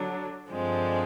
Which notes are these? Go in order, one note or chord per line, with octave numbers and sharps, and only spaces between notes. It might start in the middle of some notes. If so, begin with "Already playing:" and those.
Already playing: D3 F#3 D4
G2 D3 F3 G#3 C4